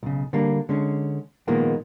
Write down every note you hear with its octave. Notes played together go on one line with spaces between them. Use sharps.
B1 C#3
D3 G3 A#3
D3 G#3 C#4
A#2 D#3 F3 G#3 A#3 B3